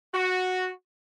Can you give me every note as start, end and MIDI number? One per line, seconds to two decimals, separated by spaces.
0.13 0.69 66